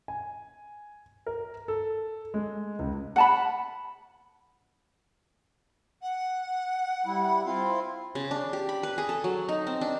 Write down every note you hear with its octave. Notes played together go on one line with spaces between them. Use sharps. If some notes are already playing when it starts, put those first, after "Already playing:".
G#5
A#4
A4
G#3
C#2
F#5 A5 B5
F#5
G3 E4
C4 E4 F4 F5
C#3
D4
G4
B5
B4
G#4
A4
F#3
D#4
C4
D4